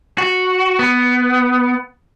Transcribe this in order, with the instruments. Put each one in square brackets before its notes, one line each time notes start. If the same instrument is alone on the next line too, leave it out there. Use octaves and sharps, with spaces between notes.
[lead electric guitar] F#4
B3